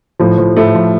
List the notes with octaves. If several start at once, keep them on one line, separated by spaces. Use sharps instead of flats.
A2 F3
F3
A2 A3
F3